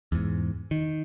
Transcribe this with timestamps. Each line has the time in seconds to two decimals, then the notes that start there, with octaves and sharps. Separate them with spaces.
0.12 E2 G#2
0.71 D#3